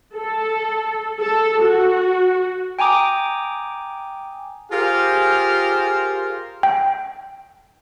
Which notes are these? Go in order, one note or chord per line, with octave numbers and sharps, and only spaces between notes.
A4
A4
F#4
G5 G#5 A#5 D6 D#6
F4 G4 G#4 A#4 C5 F5
G5